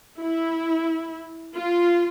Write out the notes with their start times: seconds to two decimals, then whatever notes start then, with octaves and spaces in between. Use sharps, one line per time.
0.19 E4
1.53 F4